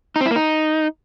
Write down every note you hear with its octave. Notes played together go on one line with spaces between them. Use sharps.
D#4
C4
E4
A#3
D#4